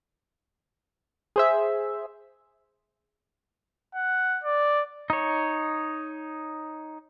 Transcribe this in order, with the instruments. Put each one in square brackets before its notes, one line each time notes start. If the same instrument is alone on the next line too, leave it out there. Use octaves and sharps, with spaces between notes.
[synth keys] G#4 C5 E5
[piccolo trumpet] F#5
D5
[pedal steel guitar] D#4 C#5